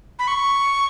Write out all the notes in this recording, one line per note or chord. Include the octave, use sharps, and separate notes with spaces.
B5
C#6